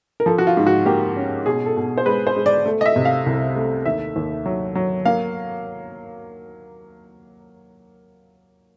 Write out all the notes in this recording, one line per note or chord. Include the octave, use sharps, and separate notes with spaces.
A#4
F3 A4
F#4
F4
G#2
F#4
A#3 G4
C#4
B2 G#4
A4
B2
C5
G#3 B4
C5
G#3
D5
A3
D#5
E5
C3
F5
C2
A3
D#2 E5
D#2
F#3
F#3
A#3 F5